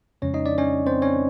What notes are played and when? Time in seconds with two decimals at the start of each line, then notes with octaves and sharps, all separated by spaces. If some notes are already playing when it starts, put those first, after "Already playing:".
0.22 F2 C#3 F3 G#3 C#4 C#5
0.34 D#4 D#5
0.46 D4 D5
0.58 C#4 C#5
0.87 C4 C5
1.02 C#4 C#5